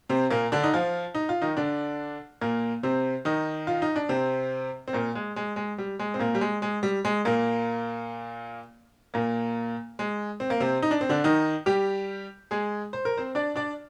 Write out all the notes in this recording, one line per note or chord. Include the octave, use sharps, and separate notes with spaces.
C3 C4
A#2 A#3
D3 D4
D#4
F3 F4
D#4
F4
D#3 D#4
D3 D4
A#2 A#3
C3 C4
D#3 D#4
F4
D#4
D4
C3 C4
C4
A#2 A#3
G#3
G#3
G#3
G3
G#3
C4
A#2 A#3
G3
G#3
G#3
G3
G#3
A#2 A#3
A#2 A#3
G#3
C4
A#3
C3 C4
D#4
D4
C4
D3 D4
D#3 D#4
G3 G4
G#3 G#4
C5
A#4
C4 C5
D4 D5
D4 D5